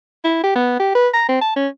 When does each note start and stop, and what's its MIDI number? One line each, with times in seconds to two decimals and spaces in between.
0.24 0.40 64
0.43 0.51 67
0.56 0.77 59
0.79 0.91 67
0.95 1.08 71
1.14 1.28 82
1.29 1.39 60
1.41 1.54 81
1.56 1.68 61